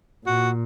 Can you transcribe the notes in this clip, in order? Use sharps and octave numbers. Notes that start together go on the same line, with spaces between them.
A#2 F#4